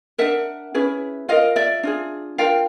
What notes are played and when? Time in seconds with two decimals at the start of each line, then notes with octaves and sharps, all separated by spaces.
0.18 D4 F4 A#4 E5 F#5
0.74 C#4 E4 G#4 B4
1.28 F4 A#4 D#5 F5
1.56 D5 E5
1.83 D4 F4 G#4
2.38 D4 F4 A#4 F5 G5